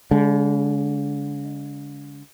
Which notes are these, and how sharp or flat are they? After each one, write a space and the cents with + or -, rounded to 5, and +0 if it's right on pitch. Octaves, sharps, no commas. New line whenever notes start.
D3 -45 G#3 -5